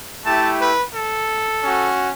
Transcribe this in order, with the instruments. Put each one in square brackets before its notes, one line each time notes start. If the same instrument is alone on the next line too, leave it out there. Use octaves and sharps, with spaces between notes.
[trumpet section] A3 E4 G4 A5
B4
A4
C#4 F#4